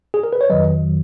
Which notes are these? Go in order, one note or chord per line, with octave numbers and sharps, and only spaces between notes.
G#4
A#4
B4
C#5
F2 D#3 F#3 B4 D#5